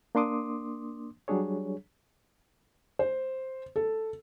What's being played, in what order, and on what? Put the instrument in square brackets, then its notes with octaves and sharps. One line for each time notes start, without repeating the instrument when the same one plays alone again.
[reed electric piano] A#3 D4 C6 D6 D#6
F#3 G3 D4 G#4 C#5
[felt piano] C5
A4